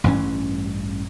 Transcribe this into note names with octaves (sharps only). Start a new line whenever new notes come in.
A1 G2 E3 C#4